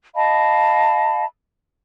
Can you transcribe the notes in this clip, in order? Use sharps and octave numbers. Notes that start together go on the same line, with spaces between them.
D#5 F5 A5 B5